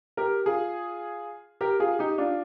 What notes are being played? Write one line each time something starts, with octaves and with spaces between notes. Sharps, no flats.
G4 A#4
F4 G#4
G4 A#4
F4 G#4
D#4 G4
D4 F4